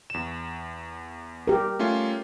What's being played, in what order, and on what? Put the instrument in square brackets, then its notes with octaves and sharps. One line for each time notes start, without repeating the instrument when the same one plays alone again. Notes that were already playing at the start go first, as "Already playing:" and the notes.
[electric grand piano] E2 E7
[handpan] G4 A#4
[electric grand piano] A3 C#4 F4